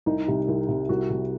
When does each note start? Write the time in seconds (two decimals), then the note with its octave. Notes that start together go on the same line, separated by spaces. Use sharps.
0.06 C2 D#4
0.27 C3 G3
0.48 C2
0.69 C3 G3
0.89 C2 F#4
1.10 C3 G3